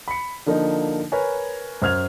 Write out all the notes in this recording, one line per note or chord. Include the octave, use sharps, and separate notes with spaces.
B5 C#7
D3 F3 A#3 D4 D#4
A#4 B4 C#5 G#5
F#2 C5 F6 G#6 F7